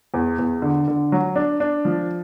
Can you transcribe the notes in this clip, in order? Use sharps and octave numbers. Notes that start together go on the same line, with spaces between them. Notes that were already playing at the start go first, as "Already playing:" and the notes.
E2
E2
D3
D3
F#3
D4
D4
F3